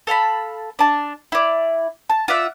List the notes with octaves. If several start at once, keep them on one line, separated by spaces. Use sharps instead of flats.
A4 F5 A5 B5
D4 A5
E4 D5
A5
F4 D5 E5 F#5